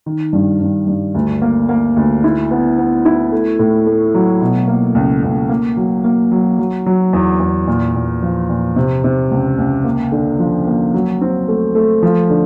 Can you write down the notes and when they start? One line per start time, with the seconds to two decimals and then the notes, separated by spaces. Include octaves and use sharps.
0.06 D#3
0.33 G2
0.61 G2
0.87 G2
1.14 D2
1.42 A#3
1.69 A#3
1.96 D2
2.24 E4
2.51 B3
2.78 B3
3.05 E4
3.32 A3
3.59 A2
3.86 A3
4.14 F#3
4.41 B2
4.68 A#3
4.95 C#2
5.23 C#2
5.49 A#3
5.77 F#3
6.04 A#3
6.32 F#3
6.59 F#3
6.86 F#3
7.13 E2
7.40 E2
7.67 A#2
7.95 A#2
8.23 F3
8.49 A#2
8.76 C3
9.04 C3
9.31 C#2
9.58 C#2
9.85 A#3
10.12 D3
10.39 F3
10.67 A#3
10.94 F#3
11.21 C4
11.48 A3
11.75 A3
12.03 F3
12.30 D3